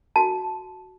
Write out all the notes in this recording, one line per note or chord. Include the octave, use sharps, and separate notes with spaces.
F#4 A5